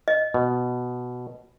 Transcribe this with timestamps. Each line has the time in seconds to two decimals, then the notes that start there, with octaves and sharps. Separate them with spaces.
0.08 D#5
0.34 B2